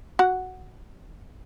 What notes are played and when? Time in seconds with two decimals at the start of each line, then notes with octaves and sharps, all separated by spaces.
0.19 F#4 F#5